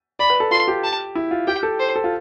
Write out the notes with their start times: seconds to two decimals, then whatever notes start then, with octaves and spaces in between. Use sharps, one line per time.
0.19 D5 B5
0.30 B4
0.40 A4
0.51 F4 C6
0.68 G4
0.84 A5
1.15 E4
1.31 F4
1.47 G4 G5
1.63 A4
1.80 C5
1.96 A4
2.04 F4